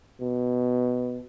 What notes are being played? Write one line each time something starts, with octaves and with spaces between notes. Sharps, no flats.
B2